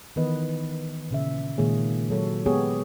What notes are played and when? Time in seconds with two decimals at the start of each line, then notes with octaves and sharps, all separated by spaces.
0.16 D#3 E3 B3 B4 D#5
1.10 A#2 C#3 E5
1.58 A#2 D#3 G#3 A#3 G#4 C#5
2.10 F#3 A4 C#5
2.46 G#3 B3 G4 G#4 C#5